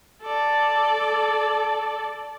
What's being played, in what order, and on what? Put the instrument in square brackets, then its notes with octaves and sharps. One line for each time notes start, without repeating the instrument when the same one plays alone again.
[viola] A4 D5